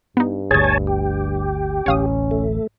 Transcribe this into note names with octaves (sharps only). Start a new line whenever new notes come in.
G2 B3 D#4
G1 D2 G#4 C#5 G#5 A5 D#6
G4
D1 A1 C#4 C#5 F5 D#6
A3